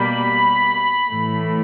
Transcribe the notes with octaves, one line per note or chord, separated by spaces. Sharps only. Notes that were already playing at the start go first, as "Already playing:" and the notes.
Already playing: B2 G3 A#3 B5
A2 E3 A3